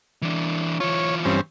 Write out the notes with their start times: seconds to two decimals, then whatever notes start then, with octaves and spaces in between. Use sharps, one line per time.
0.22 E3 D4
0.80 E3 F4 C#5
1.25 G2 C4 C#4